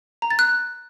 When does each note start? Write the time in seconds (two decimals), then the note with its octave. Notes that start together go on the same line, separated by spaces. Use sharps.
0.22 A#5
0.30 A6
0.39 F#6